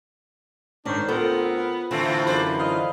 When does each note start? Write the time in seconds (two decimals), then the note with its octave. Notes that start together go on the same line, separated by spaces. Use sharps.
0.85 G#2 D#3 C#4 D4 C5 C#5
1.08 D2 B3 C4 F4 A4 A#4 C5
1.91 A2 D3 E3 A3 C4 E4 F4 A4
2.25 F#2 B4 C5 D5
2.58 F4 D#5